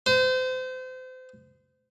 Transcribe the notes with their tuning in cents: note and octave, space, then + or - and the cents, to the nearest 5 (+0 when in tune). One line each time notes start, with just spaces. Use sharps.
C5 -30